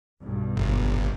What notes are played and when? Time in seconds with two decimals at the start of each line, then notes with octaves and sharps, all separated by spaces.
0.20 B1 G2 B2
0.56 G1